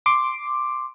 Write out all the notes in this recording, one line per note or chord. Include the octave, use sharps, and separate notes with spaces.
C6 D6